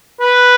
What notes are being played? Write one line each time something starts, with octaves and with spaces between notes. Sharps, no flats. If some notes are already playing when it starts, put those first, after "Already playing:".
B4